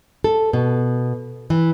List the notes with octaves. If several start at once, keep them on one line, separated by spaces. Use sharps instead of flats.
A4
B2
E3